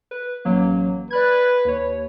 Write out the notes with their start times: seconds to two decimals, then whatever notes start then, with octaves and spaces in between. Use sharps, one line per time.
0.11 B4
0.45 A1 F#3 A#3
1.11 B4 D5 F#6 G#6
1.65 D#2 C#5